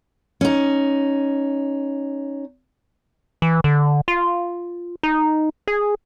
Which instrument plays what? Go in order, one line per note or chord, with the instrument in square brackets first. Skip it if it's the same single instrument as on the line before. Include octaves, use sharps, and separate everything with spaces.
[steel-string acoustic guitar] C#4 D#4
[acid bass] E3
D3
F4
D#4
G#4